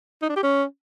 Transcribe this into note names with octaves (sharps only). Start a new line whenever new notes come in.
D#4
D4
G4
C#4